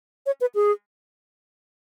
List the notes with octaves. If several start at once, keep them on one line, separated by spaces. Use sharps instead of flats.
C#5
B4
G#4